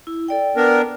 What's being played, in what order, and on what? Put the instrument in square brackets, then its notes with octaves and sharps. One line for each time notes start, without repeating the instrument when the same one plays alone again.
[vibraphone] E4
A4 D5 G5
[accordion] B3 D4 A#4